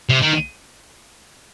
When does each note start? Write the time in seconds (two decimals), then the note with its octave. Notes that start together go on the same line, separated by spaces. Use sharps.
0.10 C3
0.22 D#3